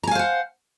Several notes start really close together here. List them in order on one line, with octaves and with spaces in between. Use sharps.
A#5 G#5 F5 C5 F#5